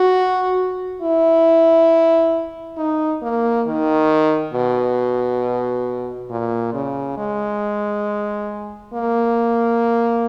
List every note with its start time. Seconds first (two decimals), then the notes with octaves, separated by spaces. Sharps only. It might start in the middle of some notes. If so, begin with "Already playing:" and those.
Already playing: F#4
1.01 E4
2.78 D#4
3.22 A#3
3.67 D#3
4.54 B2
6.31 A#2
6.74 C#3
7.18 G#3
8.94 A#3